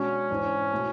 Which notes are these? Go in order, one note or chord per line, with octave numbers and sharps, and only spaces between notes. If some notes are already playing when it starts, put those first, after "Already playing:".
Already playing: B2 G#3 C#4 D4 F#4
G#2 E3 G#3 D4
B2 A3 E4